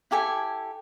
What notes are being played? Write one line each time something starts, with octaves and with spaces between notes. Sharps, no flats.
E4 G4 A4 G#5